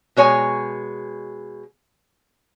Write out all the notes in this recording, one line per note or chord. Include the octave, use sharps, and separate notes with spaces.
B2 G#3 C#5 G#5